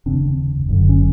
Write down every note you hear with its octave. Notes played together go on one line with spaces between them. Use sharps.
F1 D#2 C#3 C4 D4
F#1 F#2 D3
C#4